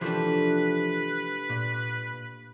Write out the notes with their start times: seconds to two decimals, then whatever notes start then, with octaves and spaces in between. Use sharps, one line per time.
0.01 C3 E3 F3 A3 D4 B4
1.50 A#2